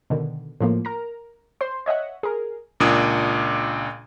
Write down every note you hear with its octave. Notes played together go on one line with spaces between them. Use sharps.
B2 D3 D#3
A2 F3 A#3
A#4 A#5
C5 C6
C#5 D#5 E5 F#5
G#4 A#4
C#2 A#2 D4 D#6 G#6